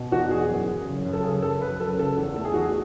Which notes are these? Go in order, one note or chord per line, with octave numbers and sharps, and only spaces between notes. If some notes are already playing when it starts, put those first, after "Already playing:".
Already playing: B2
E2 F#4
E2 G#4
F#2
F#2
C#3
F#2
A4
C#3 G#4
F#2 A4
F#2 B4
F#2 A4
C#3 A4
E2
A3 A4
G#4
E2 F#4
G#4